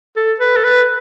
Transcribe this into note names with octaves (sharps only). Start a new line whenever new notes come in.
A4
B4
A4
B4